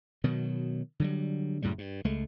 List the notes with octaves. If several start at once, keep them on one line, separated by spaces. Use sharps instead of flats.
B2 D#3 F#3
D3 F#3 G3
F#2 A2 C#3 G3
G2
C#2 G#3 A3